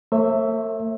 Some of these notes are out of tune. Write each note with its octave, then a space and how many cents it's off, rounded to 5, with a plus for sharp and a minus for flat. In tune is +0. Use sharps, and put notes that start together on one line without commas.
A3 +45 C#5 -45 E5 +0